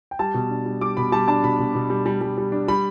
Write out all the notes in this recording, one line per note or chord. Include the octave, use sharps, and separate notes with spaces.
G5
G3 A5
B2
D4
G3
G3 D6
B2 B5
G3 A5
D4 A5
B2 B5
B2
B2
G3
G3
G3
G3
D4
G3 B5